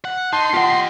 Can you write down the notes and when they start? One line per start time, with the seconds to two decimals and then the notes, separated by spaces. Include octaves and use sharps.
0.05 F#5
0.33 D#4 A5 C6
0.54 F4 G4 D#5 F#5